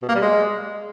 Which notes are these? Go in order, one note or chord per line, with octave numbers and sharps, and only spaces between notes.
B2
A#3
G3
G#3